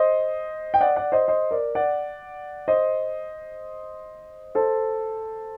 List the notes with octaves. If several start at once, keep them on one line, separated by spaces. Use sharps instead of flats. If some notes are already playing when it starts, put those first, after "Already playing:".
Already playing: C5 D#5
G5
D5 F#5
D5 F#5
C5 D#5
C5 D#5
A#4 D5
D5 F#5
C5 D#5
A4 C5